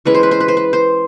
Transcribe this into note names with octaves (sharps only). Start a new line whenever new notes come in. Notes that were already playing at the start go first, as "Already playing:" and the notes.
E3 G#3 C#4 B4
C5
B4
C5
B4
C5
B4
C5